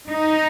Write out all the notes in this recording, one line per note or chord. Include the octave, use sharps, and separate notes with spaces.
D#4